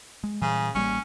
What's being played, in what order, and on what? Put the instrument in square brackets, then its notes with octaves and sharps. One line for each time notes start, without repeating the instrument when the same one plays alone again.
[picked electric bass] G#3
[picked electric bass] A#2 E3 G3 [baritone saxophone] C#3
[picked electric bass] A1 G3 A#3 [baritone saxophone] C#4